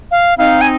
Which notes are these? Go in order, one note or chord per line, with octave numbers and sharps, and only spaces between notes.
F5
C4 D#4 F5
G#5